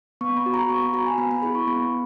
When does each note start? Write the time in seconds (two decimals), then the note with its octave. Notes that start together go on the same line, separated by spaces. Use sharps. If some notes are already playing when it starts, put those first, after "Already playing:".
0.21 B3 C#6
0.37 B5
0.46 F#4
0.54 A#5
0.69 B3 C#6
0.82 B5
0.93 F#4 A#5
1.07 G#5
1.18 B3 B5
1.31 B5
1.42 E4 G#4 B5
1.55 C#6
1.67 B3 B5